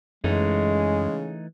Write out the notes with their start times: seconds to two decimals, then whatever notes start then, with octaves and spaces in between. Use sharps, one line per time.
0.24 F#2 C#3 E3 G#3 A3 D#4